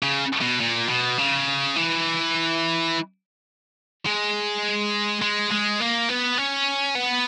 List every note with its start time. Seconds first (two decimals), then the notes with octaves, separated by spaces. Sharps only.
0.02 C#3
0.41 B2
0.60 A#2
0.89 B2
1.18 C#3
1.76 E3
4.06 G#3
5.22 G#3
5.51 G#3
5.80 A#3
6.09 B3
6.38 C#4
6.95 B3